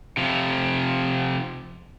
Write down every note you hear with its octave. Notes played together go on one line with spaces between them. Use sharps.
C3 F3